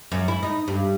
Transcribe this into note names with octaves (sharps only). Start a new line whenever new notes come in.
F#2
E4
D#4
G2